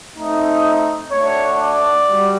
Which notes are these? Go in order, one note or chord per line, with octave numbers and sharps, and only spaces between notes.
A3 C4 D#4
A3 D4 F#4 C#5
D5
G3 F#4